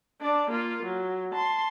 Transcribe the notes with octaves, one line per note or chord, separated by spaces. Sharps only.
D4 D5
A#3 F4
F#3
A5 C6